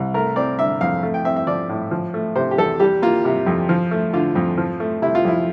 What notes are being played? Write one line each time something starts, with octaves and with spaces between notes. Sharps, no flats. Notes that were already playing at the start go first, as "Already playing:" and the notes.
Already playing: C2
A3 A#4
C4 D5
D3 E5
F2 F5
A3
G5
C4 E5
E5
F3 D5
A2
F3
A3
C3 C5
G4
E2 A4
G3 G4
A#3 F4
C3
F2
F3
A3
D3 F4
F2
F3
A3
C3 E4
F4
F2 E4